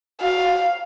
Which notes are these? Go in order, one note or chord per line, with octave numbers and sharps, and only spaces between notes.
F#4 F5